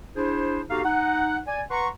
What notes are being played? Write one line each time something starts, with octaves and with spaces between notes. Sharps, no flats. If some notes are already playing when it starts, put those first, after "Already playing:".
D4 E4 G#4 C5
B3 D#4 F#4 G4 A4 F5
D#4 F#5
D5 G#5
B4 F#5 A#5 C6 C#6